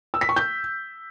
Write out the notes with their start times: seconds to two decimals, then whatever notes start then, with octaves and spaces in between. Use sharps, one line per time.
0.14 E6
0.21 B6
0.29 C#6
0.36 G6